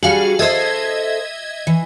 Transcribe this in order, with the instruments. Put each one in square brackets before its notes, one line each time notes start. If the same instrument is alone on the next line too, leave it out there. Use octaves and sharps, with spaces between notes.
[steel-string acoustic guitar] G3 D4 G#4 [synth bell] F#4 F5 C#7
[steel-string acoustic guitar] A4 C5 [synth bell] D#5 E5 G#6
[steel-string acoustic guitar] E3